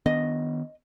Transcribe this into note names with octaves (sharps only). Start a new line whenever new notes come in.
D#3 B3 D4 D#5